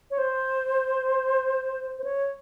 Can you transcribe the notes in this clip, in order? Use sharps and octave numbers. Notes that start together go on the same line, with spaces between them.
C#5
C5
C5
C#5